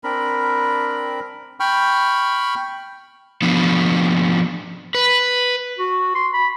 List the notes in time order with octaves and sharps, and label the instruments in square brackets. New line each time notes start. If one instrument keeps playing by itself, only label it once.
[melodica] C4 D4 A#4 B5
[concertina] G5 B5 C#6 F6
[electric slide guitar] F3 B3 D4
B4
[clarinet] F#4
C6
B5